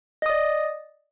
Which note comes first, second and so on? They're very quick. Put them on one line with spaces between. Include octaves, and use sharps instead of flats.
D#5 D#6 D5